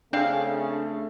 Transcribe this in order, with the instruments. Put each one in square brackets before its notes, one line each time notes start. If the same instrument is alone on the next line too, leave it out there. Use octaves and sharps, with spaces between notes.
[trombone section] C#3 A3 [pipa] C4 F5 [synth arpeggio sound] D4 G#4